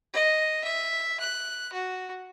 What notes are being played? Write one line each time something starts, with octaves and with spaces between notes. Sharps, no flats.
D#5
E5
F#6
F#4